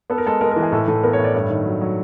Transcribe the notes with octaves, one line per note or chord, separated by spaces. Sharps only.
B3 A4
A#4
G#3 A4
G#3 A#4
A#4
E3
G#4
A2 A4
A2 A4
B3 A#4
C#5
A2
D5
G2 C#5
D#3
F#3
F#3